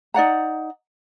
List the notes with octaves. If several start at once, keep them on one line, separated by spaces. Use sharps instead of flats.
D#4 D5 F#5 A#5